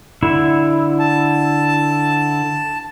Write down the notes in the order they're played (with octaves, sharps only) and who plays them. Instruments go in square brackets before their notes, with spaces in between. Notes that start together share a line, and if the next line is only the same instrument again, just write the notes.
[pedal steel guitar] D3 E4
[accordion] A5